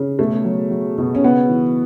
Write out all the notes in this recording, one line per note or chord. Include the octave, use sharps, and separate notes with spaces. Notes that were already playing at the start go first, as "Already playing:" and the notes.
Already playing: C#3
B2 A3
F#3
F#3
B2
C#4
C#3 B3
E3